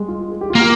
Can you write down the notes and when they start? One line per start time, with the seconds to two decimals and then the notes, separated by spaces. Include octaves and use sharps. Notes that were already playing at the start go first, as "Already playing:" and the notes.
Already playing: G3 G#3
0.08 F4
0.31 G#4
0.41 G4
0.50 F4
0.55 A#3 G4